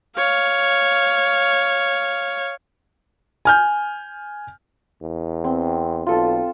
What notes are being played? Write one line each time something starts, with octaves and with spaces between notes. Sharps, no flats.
C#5 F5
G#5 F6 G6
E2
C4
B1 F4 A4